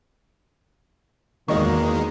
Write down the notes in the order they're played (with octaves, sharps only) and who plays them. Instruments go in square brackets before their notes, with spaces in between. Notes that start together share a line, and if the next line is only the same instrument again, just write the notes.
[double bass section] E2 [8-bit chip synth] D#3 G#3 [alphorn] A#3 [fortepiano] F#4 D#5 C#6